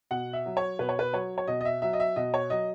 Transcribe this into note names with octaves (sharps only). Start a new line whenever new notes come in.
B2 F#5
E5
F#3
C#5
B2 B4
C#5
B4
F#3 C#5
C#5
B2 D#5
D#5
E5
F#3 E5
D#5
E5
B2 D#5
C#5
F#3 D#5